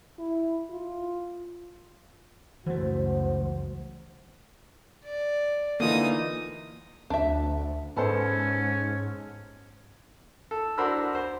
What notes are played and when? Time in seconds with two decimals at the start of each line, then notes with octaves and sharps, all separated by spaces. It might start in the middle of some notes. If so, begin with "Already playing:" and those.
0.19 E4
0.70 F4
2.66 F#1 C#2 E3 A3 F#4 C5
5.04 D5
5.80 D3 E3 A#3 D#4 F4 D#6
7.10 D2 D4 E5
7.96 G#2 B3 C#4 A4 C5
10.51 A4
10.78 D4 F#4 A#4 C5 B5 E6
11.15 C5